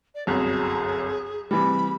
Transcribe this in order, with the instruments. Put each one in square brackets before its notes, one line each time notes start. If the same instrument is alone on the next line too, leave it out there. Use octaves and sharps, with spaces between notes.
[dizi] D5
[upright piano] G1 C2 F#2 [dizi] G#4
[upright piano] C3 E3 G3 [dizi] B5